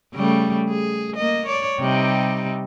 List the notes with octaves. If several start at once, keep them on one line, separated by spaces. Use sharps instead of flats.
C#3 G3 A3
G#4
A#3 D#5
C#5 D5
C3 G3 D#4